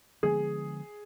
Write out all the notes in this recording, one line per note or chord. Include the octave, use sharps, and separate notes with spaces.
D3 F3 G#3 B3 G#4